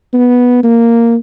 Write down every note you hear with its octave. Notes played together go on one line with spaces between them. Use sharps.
B3
A#3